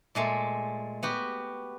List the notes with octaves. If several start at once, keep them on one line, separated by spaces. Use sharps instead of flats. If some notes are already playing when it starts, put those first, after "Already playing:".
A#2 G#3 A3
B3 F#4 G4